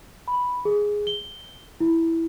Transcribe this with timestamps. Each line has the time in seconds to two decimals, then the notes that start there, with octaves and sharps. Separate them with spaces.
0.28 B5
0.65 G#4
1.07 G7
1.80 E4